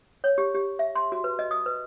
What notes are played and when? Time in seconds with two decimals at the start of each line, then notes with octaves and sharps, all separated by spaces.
0.24 C#5
0.38 G4
0.55 G4
0.79 E5
0.95 C6
1.12 F#4
1.24 B4
1.39 D#5
1.51 D#6
1.66 B4